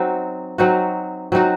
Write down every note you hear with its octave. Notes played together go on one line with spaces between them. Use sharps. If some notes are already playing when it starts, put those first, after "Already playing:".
Already playing: F#3 C4 D#4 F#4
F#3 C4 D#4 F#4
F#3 C4 D#4 F#4